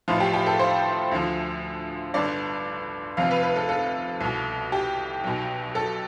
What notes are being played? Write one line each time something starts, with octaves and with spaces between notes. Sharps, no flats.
A1 A2 F3 F4
G4
G4
A4
C5
D2 D3 F3
G1 G2 D3 D5
F1 F2 C3 F5
B4
B4
A4
A4
C2 B2
G4
B1 B2
A4